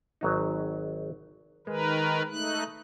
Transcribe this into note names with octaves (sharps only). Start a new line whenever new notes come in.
G#1 F#3 D#4
D#3 G#3 A#4 B4
A3 D#4 F#6